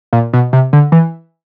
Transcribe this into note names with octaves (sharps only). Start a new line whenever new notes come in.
A#2
B2
C3
D3
E3